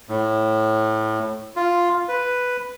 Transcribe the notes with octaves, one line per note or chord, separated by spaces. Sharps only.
A2
F4
B4